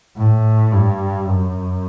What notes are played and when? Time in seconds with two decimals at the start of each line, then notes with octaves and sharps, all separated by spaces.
0.17 A2
0.72 G2
1.27 F#2